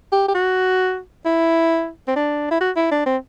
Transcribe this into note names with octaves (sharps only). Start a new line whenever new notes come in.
G4
G4
F#4
E4
C4
D4
E4
F#4
E4
D4
C4